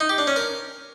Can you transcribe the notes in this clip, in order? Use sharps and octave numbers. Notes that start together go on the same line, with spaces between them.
D#4
G4
D4
C#4
A#4